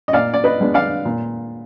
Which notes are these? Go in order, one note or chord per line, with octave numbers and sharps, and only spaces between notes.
D#5
A#2 D5 F5
D5
B4 D#5
G#3 B3 D4
D5 F5
A#2